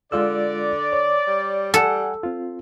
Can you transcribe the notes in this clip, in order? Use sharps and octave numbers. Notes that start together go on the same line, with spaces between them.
D3 G#3 F4 D5 E6
C#5
G3
A4 F#5 G#5
C4 F4